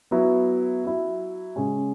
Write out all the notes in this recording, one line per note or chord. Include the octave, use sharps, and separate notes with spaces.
F#3 B3 E4
F#3 E4
C#3 G#3 C#4